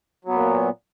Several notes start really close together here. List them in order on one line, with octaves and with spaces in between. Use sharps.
F#3 B3 A#2